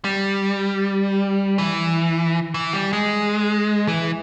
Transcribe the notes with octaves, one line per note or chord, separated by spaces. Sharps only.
G3
E3
E3
G3
G#3
E3